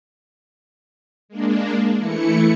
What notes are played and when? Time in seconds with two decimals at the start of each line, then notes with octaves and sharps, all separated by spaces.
1.29 G#3 A#3 D4
1.99 E3 A3 E4 C#7